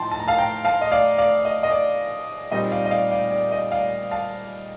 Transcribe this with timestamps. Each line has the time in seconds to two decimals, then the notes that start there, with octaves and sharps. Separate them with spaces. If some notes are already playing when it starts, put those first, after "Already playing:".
Already playing: A2 F3 D#4 G5 A5 A#5 C6
0.12 A5
0.20 A#5
0.28 F5 A5
0.38 G5 A#5
0.65 F5 A5
0.81 D#5
0.91 D5 F5
1.18 D5 F5
1.45 D#5
1.63 D#5
1.72 D5
2.51 A#2 G3 C4 D#4 D#5
2.71 D5 F5
2.85 D#5
2.91 D5 F5
3.11 D5 F5
3.31 D5
3.52 D#5
3.71 D5 F5
4.11 F5 A5